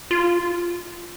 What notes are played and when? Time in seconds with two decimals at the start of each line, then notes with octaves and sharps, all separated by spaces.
0.11 F4